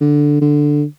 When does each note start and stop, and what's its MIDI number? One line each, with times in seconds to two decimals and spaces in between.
0.01 0.39 50
0.42 0.84 50